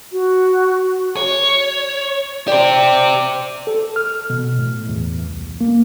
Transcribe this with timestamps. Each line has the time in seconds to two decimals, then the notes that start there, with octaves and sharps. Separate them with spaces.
0.12 F#4
1.17 C#5
2.48 G4 C5 D5
3.67 A4
3.96 F6
4.30 B2
4.59 A2
4.89 E2
5.30 C2
5.61 A#3